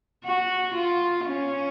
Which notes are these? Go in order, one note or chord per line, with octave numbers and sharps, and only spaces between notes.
F#4
F4
C#4